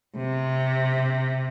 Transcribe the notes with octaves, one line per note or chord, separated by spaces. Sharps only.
C3